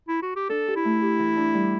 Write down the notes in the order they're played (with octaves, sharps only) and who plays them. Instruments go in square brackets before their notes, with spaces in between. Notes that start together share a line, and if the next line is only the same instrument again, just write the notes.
[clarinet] E4
F#4
G4
[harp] D4 [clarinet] A4
[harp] G4
[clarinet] E4
[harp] A3
G4
E3
D4
G3